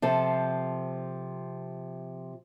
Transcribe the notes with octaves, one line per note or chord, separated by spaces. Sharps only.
C3 F3 A4